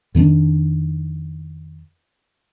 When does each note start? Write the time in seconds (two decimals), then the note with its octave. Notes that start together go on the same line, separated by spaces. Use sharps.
0.15 F2 D#3 B3 D4